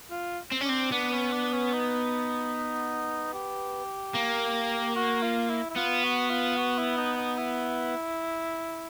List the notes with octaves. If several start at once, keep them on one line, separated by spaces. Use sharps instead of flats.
F4
C4
C#4
C4 D4
B3 D4
C#4
D4
C#4
D#4
G4
A#3
F#4
F4
E4
E4
B3 F4
F#4
F4
F#4
E4
D#4
D#4
E4